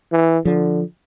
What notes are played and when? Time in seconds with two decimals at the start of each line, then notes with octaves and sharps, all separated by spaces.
0.12 E3
0.45 D3 F3